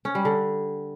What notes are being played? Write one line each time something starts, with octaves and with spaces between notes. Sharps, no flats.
C#4
G3
D3